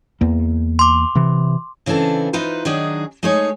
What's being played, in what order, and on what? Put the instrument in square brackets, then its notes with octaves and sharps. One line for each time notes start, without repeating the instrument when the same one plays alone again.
[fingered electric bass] E2 A#3
[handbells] C6 D6
[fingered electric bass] C3 E3
[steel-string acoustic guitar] C#3 E3 C4 D4 A4
E3 D#4 F4 B4 C5
D#3 F#3 D4 D#4 G#4 D#5
G#3 A3 D#4 G#4 C#5